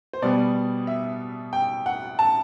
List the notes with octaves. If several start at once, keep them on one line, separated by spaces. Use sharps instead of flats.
C5
B2 G3 B3 D5
E5
G5
F#5
A5